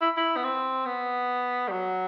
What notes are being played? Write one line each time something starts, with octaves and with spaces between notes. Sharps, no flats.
E4
E4
B3
C4
B3
G3
F#3